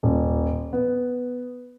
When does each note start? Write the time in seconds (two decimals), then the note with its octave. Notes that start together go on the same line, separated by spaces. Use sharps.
0.03 D#1
0.73 B3